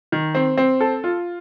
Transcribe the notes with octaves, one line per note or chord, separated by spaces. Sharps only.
D#3
C4
C4
A4
F4